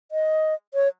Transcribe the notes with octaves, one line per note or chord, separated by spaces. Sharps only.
D#5
C#5